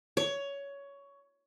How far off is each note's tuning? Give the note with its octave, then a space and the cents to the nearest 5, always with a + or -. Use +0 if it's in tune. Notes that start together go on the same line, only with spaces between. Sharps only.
C#5 +15